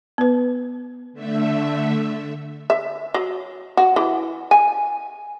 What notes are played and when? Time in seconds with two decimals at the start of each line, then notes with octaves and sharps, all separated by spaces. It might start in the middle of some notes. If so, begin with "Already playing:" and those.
0.18 B3 B4
1.13 D3 A3 E5
2.70 E5
3.14 F#3
3.77 F#4
3.96 E3
4.51 G#5